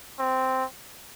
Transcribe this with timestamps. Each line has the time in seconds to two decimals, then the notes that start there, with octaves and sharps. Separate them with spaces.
0.19 C4